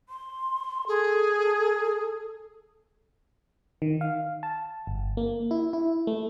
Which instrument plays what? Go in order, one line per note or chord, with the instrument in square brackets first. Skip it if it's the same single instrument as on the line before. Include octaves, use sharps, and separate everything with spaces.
[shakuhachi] C6
[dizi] G#4 [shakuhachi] A4
[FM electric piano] D#3
F5
A5
G1
A#3
E4
E4
A3